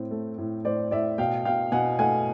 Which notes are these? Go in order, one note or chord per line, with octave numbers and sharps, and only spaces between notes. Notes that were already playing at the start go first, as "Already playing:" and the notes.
Already playing: A2 C4
A3
A2
A2 C5 D5
A2 D5 E5
B2 F5 G5
B2 F5 G5
B2 F#5 G#5
A3 F#5 G#5